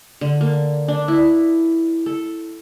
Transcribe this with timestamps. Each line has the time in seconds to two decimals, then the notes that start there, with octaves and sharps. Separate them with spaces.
0.21 D3
0.41 A#3
0.88 D4
1.08 E4
2.06 A4